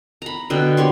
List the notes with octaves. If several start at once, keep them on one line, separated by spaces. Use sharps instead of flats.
A#5 B5
B2 D3 G5
B3 G4 C#5 C6